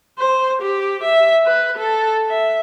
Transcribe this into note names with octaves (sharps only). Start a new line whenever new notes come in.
C5
G4
E5
B4
A4
E5